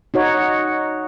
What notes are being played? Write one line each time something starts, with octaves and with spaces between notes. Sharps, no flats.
D#4 F#4 C#5